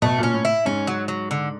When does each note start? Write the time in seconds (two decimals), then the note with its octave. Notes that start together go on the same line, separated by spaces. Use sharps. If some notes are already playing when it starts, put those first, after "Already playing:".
0.02 B2 A3
0.18 A#2 C#4
0.34 A2
0.45 E4
0.65 G#2 C#4
0.87 F#3
1.08 F#3
1.31 D3